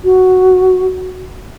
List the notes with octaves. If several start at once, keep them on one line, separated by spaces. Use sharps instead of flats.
F#4